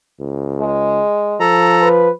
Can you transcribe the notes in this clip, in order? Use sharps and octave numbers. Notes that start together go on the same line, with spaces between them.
C#2
G#3
F3 A4 A#5
B4